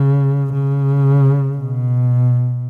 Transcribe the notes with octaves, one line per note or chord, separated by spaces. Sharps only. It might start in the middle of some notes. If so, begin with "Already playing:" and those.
Already playing: C#3
C#3
B2